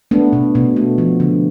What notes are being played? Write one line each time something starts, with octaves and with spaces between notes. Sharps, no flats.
A3 B3 D4
B2
B2
A3
F3
D3